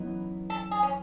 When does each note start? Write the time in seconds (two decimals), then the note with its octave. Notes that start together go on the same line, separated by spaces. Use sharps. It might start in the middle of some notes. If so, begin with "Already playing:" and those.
Already playing: F#2 E3 B3 D#4
0.50 A4
0.71 G#4
0.83 C#4